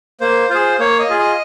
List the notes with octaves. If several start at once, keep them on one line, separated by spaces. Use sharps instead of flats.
A#3 C5
F4 G#4 C5
A#3 C#5
D#5
F4 G#4
D#5